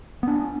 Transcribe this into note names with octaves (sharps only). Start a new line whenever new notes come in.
B3 D4